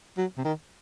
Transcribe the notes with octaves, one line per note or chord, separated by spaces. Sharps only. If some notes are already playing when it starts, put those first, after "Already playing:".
F#3
C3
D#3